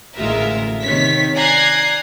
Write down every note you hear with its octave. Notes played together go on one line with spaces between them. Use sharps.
A1 D2 G#3 F4 A#4 E5
C3 D#3 C#5 B6
D5 G#5 A#5 F#6 G#6 C7